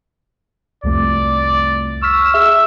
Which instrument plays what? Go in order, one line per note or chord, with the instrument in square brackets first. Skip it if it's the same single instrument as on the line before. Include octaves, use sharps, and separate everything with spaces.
[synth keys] C2 F2 A3 [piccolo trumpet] D5
[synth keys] C#6 F6 B6 [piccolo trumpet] E6
[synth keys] G#4 E5 [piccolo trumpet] E6